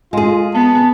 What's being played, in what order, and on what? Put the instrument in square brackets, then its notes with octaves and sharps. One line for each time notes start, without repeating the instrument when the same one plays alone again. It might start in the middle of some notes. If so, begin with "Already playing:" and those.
[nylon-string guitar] G#3 G#4 [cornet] F4
[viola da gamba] B3 [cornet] A5